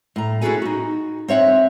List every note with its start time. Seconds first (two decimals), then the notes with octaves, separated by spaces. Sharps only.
0.16 A2 A#5
0.41 C#4 E4 F#4 G#4 A4 G#5
0.62 D#4 F#4
1.28 C4 C#5 E5 F#5